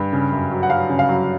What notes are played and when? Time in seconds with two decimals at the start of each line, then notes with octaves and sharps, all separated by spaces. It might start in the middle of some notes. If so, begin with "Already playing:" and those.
Already playing: G2
0.13 C#3
0.32 F#2
0.51 F#3
0.63 F#5
0.70 F#3 F5
0.89 C#3
0.99 F5
1.09 F#3